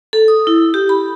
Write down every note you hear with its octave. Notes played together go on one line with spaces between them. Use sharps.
A4
D#6
E4
G4
B5